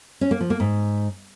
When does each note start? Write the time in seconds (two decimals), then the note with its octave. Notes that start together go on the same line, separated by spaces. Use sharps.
0.21 C#4
0.31 A#3
0.41 F3
0.50 A#3
0.60 G#2